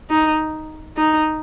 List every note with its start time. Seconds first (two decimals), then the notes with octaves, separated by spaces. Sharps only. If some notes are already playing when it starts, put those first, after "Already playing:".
0.10 D#4
0.97 D#4